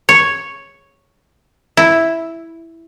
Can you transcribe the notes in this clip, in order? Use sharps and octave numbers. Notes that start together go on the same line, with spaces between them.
C#5
E4